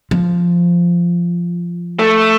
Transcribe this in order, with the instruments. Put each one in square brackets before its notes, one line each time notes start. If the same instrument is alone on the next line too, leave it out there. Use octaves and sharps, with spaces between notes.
[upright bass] F3
[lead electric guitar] A3